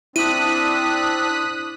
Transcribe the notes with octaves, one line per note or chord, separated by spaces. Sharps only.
C4 D4 E4 D#6 F#6 B6 D#7